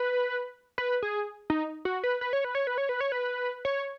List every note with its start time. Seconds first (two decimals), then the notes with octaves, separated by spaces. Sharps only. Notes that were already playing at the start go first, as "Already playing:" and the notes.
Already playing: B4
0.78 B4
1.02 G#4
1.50 D#4
1.85 F#4
2.04 B4
2.21 B4
2.33 C#5
2.44 B4
2.55 C#5
2.67 B4
2.78 C#5
2.89 B4
3.00 C#5
3.12 B4
3.65 C#5